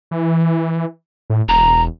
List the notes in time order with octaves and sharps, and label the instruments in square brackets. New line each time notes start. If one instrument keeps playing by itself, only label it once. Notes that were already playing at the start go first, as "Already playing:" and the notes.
[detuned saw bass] E3
A2
[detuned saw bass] E1 [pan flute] A#5